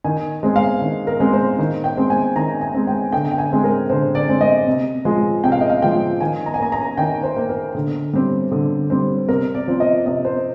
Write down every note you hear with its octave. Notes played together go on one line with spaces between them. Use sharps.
D#3 G#5
G#3 C4
F5
D#3
A#4
G#3 C4
C5
D#3
G5
G#3 C4
G#5
D#3 A#5
G#5
G#3 C4
G5
D3 G5
G5
G#5
G#3 C4
A#4
D3 C5
D5
G#3 C4
D#5
C3
F3 G#3
C3 G5
F5
D#5
F5
F3 G#3 G5
D#3 G#5
A#5
G#5
A#3 A#5
A#5
D#3 G5
C5
A#3
A#4
D3
G3 C4
D3
G3 C4
C3 A#4
D5
F3 C4
D#5
C3 D#5
C5